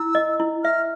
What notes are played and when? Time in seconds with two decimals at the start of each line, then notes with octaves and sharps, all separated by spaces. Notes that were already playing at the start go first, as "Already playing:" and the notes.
Already playing: E4 E6
0.15 D#5
0.40 E4
0.64 E5 F6